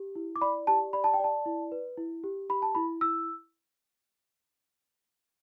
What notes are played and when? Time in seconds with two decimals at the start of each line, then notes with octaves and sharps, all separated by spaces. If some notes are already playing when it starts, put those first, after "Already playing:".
Already playing: G4
0.16 E4
0.36 D6
0.41 D5 B5
0.67 G4 A5
0.93 D5 B5
1.04 A5
1.14 G5
1.19 D5 A5
1.46 E4
1.72 B4
1.98 E4
2.24 G4
2.50 G4 B5
2.62 A5
2.75 E4 B5
3.01 E4 E6